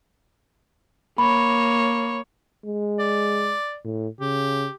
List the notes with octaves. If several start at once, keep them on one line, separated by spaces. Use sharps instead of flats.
A#3 C#5 B5
G#3
D5
A2
C#3 G4